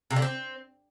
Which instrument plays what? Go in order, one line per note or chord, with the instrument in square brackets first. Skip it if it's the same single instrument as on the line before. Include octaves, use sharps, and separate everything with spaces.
[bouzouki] C3
D3
C4